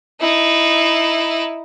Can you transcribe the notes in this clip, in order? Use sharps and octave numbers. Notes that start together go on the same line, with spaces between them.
D#4 E4